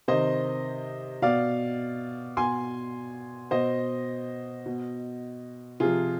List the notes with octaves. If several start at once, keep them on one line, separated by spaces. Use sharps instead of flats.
C3 D#3 C5 D#5
B2 D5 F5
B2 G#5 C6
B2 C5 D#5
B2
C3 F3 F4 G#4